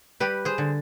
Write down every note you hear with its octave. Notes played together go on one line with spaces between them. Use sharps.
G3 G4 B4
G#4 C5
D3